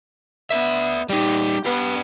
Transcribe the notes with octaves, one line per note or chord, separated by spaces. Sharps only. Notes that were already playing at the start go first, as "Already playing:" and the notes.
B3 D4 E5
G3 D#4 G4
B3 G4 B4